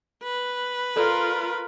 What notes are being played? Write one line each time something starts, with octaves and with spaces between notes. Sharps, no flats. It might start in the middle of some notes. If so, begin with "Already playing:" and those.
B4
F4 A4 A#4 D5